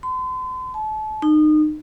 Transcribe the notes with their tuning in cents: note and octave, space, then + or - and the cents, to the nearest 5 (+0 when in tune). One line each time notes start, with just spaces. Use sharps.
C6 -40
A5 -35
D#4 -30